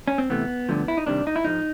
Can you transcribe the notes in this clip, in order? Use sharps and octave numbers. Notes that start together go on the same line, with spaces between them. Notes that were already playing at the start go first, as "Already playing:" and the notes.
C#4
C4
C3 E3 A3 B3
G2 D3 F3 A3
E4
D#4
C3 D#3 G3 D4
D#4
E4
G#2 F3 G#3 D#4